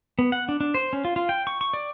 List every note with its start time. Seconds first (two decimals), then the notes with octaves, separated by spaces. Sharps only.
0.19 B3
0.32 F#5
0.49 D4
0.61 D4
0.74 C5
0.93 C#4
1.05 F4
1.16 F4
1.29 G5
1.47 C#6
1.61 C#6
1.74 D5